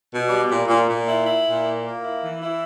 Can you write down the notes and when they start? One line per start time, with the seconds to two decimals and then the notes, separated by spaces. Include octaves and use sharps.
0.10 B2
0.29 G3
0.48 A#2
0.67 A#2
0.87 A#2
1.07 E4
1.26 E4
1.45 A#2
1.64 A#3
1.84 A#3
2.03 E4
2.21 E3
2.42 E4